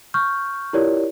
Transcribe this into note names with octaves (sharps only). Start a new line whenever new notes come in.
C#6 F6 G6
E4 F4 G4 A#4 C#5 D5